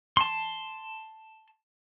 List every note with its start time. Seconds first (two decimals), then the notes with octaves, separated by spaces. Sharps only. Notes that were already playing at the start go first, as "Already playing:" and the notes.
0.17 A5 C6